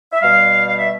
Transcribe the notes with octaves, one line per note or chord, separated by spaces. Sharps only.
E5
B2 G3 F5
F5
E5